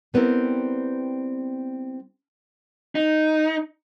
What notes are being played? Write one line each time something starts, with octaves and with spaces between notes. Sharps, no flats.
G3 B3 C4 E4 A#4
D#4